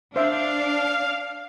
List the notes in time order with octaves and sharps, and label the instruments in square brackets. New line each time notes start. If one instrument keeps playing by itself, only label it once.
[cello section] D4 [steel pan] C5 E5 [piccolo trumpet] F5